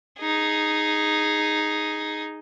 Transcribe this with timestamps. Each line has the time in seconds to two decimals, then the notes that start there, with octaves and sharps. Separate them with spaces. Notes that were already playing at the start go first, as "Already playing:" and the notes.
0.20 D#4 G#4